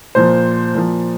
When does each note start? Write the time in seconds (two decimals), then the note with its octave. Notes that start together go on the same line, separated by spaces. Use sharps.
0.15 A#2 F3 C5
0.75 A#2 F3